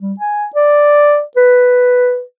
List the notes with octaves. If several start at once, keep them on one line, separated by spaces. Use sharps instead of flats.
G3
G#5
D5
B4